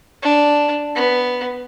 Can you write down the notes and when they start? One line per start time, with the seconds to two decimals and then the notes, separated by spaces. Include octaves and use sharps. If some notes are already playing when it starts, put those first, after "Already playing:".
0.23 D4
0.96 B3